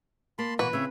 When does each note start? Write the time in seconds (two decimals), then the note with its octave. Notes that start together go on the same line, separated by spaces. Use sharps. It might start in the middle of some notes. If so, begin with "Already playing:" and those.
0.39 A#3 A5 B5 C6
0.59 B2 E3 A#3 F#4 B4 C#6
0.73 C#3 C4 C#5 E5